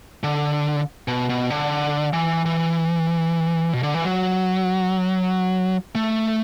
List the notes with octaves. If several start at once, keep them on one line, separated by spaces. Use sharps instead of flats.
D3
B2
B2
D3
E3
E3
B2
D3
E3
F#3
A3